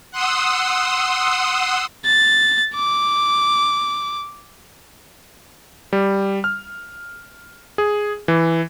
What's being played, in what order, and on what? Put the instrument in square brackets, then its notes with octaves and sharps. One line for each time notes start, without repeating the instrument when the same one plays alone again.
[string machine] F#5 C6 D#6 E6
[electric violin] A6
D6
[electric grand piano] G3
F6
G#4
E3